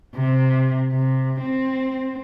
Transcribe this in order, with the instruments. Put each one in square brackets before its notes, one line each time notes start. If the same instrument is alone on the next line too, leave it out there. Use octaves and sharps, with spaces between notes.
[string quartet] C3
C3
C4